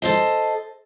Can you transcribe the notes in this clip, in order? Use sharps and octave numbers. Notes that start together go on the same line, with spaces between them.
A4 C5 D#5